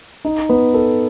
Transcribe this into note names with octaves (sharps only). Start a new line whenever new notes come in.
D#4
B3
A4